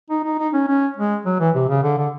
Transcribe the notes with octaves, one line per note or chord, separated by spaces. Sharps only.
D#4
D#4
D#4
C#4
C#4
G#3
F#3
E3
C3
C#3
D3
D3